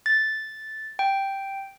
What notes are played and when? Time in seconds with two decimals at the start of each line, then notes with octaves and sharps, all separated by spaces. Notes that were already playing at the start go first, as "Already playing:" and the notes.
0.06 A6
0.99 G5